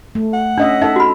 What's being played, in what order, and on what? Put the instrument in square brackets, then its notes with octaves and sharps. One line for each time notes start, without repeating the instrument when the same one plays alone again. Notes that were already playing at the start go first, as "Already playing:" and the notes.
[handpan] A3
[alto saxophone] F#5
[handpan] C#4 D#5 E5 [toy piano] D4
[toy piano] D#4 [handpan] A4 E5
[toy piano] F#4 B5